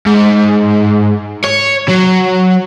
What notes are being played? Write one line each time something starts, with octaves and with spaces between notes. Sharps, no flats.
G#2
C#5
F#3